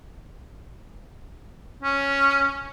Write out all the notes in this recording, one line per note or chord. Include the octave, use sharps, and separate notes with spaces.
C#4